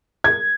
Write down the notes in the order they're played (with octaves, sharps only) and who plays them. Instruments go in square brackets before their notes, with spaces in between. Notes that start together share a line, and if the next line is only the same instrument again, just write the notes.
[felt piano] G#6